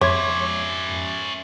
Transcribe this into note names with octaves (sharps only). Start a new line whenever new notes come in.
F2 C#4 C#5 E5 C6 D6 G#6